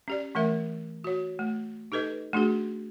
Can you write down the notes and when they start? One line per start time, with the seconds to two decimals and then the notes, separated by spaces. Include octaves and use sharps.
0.08 C#4 G4 D5
0.35 E3 A3 A#4 E5
1.04 F#4 C#5
1.39 A3
1.92 D#4 G4 A4 B4 D#5
2.33 A3 D4 F#4 G#4